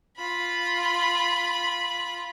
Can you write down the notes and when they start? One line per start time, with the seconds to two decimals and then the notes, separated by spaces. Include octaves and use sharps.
0.17 F4 B5